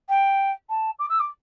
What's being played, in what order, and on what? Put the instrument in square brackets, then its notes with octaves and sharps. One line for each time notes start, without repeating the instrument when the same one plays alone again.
[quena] G5
A5
D6
E6
D6